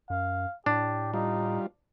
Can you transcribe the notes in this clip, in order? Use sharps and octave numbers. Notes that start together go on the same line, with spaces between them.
F#2 F5
A2 D4 G4
G3 D#4 F4